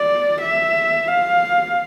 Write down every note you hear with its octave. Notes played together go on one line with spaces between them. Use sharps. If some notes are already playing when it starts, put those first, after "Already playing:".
Already playing: D5
E5
F5